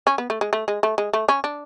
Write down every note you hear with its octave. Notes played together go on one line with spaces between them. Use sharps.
C#4
B3
A3
G#3
A3
G#3
A3
G#3
A3
C#4
D4